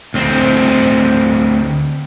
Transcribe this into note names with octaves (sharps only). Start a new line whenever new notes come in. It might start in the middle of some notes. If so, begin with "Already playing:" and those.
D2 C4